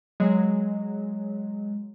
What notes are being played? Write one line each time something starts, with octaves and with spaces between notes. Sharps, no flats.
F#3 G#3